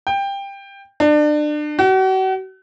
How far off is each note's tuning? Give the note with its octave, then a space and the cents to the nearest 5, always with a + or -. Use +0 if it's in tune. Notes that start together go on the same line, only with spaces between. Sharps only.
G5 +15
D4 +30
F#4 +40